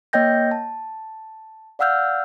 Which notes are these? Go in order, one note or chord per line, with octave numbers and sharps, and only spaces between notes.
A#3 C#5 D#5 G5 G6 A#6
A5
D5 F5 F#5 E6 F6 G6